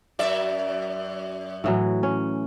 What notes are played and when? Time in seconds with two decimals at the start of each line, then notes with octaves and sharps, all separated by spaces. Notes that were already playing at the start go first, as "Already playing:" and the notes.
0.19 F#2 D5 E5
1.64 A2 E3 F#3
2.03 C#4